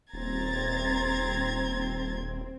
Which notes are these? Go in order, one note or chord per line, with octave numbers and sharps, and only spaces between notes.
D#1 C4 A#5 G#6 A6